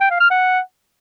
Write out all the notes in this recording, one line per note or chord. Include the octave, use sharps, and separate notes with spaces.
G5
F5
F6
F#5